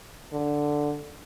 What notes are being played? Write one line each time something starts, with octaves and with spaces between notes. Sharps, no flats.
D3